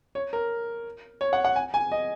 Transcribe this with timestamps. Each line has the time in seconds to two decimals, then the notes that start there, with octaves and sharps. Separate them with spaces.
0.15 C#5
0.33 A#4
1.21 C#5
1.33 F#5
1.45 F#5
1.56 G#5
1.74 G#5
1.92 D#5